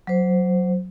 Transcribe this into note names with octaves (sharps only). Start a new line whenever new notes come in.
F#3 C5